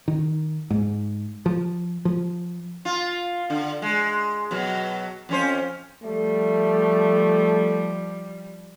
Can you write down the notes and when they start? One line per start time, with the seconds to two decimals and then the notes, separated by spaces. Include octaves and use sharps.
0.08 D#3
0.70 G#2
1.46 F3
2.05 F3
2.85 F4
3.50 D3
3.82 G#3
4.51 B2 F#3
5.29 F2 C#4 C5
6.03 F3 G3 A3